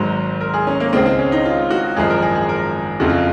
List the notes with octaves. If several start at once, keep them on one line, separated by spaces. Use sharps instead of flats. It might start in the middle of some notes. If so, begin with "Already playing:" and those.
Already playing: G#1 G#2 F#3 C5
A#4
G#4
C#4
A#3
C#2 C#3 G#3 C4
C4
C#4
D#4
F4
F#4
G#1 F#2 F3 G#3 G#4
A#4
G#4
G#4
A#4
F#1 F2 C#3 F#4
F4